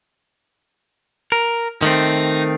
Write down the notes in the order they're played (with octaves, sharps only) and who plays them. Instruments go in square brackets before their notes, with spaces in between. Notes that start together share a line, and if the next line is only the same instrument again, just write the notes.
[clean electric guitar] A#4
[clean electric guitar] D#3 A3 C4 [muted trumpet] D#4